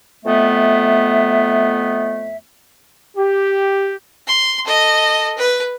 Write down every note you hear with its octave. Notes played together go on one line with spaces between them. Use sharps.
F2 A3 B3 E5
G4
C6
A4 D#5
B4